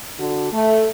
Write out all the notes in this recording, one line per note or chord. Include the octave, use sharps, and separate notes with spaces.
D3 F#4
A3